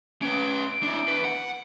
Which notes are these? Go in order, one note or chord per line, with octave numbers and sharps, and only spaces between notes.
C#4 B4 D7
D4 E4
E2 B4
F#5